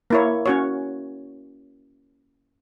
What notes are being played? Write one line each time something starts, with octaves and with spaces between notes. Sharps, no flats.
A#3 E4 C#5
C#4 F#4 C#5